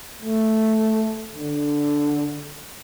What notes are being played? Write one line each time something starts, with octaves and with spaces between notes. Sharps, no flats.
A3
D3